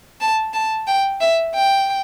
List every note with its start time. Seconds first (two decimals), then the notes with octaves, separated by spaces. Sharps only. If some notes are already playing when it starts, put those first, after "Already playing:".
0.21 A5
0.54 A5
0.87 G5
1.21 E5
1.55 G5